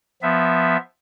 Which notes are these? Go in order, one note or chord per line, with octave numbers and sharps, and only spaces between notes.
F3 B3 E5